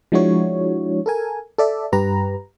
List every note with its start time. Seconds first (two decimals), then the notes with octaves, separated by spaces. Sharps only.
0.12 F3 G#3 D4 E4 F#4 C#5
1.06 A4 A#4 G#5
1.58 A4 D5 E5
1.92 G2 G4 B4 A#5